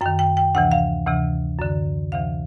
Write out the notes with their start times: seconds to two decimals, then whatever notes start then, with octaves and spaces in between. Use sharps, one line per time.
0.01 F#2 D#3 G5
0.19 G5
0.37 G5
0.55 D2 C3 E3 F#5
0.72 F5
1.07 D2 C3 E3
1.59 F#2 D3
2.12 D2 C3 E3 F5